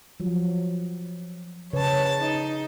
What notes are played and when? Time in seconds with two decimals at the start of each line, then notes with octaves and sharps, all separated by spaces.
0.20 F3 F#3
1.73 C#3 B4 C#5 A5
2.20 D#4